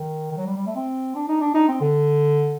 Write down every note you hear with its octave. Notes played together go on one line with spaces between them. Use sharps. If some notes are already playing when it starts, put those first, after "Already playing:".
Already playing: D#3
D#3
F#3
G3
G3
A3
C4
D4
D#4
D4
D#4
C4
D3